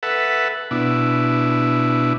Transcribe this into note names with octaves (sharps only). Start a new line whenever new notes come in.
A4 B4 E5 F#5
B2 D4 E4